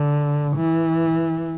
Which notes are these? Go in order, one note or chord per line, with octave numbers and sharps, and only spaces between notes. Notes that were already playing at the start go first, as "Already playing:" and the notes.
Already playing: D3
E3